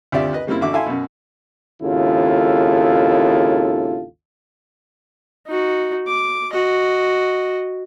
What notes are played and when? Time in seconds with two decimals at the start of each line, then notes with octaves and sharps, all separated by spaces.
0.12 D2 C4 F4 G4 D5 E5
0.33 B4 D#5
0.47 C#3 G3 A#3 C4 E4
0.61 A1 D3 F#4 E5 D6
0.73 E4 A4 E5 F5 G#5 C6
0.86 F#2 B2
1.82 G#1 D#2 C#3 E4 F4 A4
5.47 D#4 F#4
6.07 D6
6.53 F#4 D#5